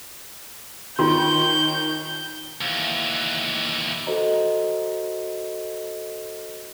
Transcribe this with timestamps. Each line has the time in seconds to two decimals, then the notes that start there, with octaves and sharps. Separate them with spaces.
0.99 D#3 F4 C6 G6
2.61 D#2 E3
4.07 F#4 A4 C5 D#5 A#5